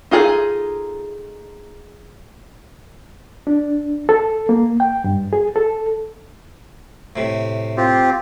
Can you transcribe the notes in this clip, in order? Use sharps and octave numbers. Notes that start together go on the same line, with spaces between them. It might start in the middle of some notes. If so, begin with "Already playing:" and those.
D#4 F4 G#4 A4
D4
A4
A#3
G5
G2
G#4
A4
A2 C3
C4 F4 G4